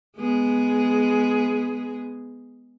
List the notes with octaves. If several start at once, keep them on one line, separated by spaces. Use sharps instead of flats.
G#3 B3 G#4